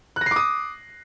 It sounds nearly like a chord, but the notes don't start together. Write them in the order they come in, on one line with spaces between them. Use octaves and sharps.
F#6 A#6 C7 D6 D#6